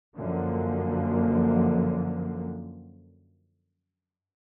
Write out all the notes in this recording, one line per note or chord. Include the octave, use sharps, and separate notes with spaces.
F#2 D3 F3 A#3